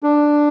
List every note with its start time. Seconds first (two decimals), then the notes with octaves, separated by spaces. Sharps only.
0.03 D4